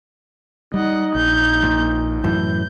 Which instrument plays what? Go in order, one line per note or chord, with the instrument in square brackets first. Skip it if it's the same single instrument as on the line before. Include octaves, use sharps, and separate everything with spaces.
[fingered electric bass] G3 [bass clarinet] D#4 [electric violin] D#5 F#5
[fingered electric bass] A#1 [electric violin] G6
[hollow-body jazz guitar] A#2
[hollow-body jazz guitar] F#2 A2 E3 [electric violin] G6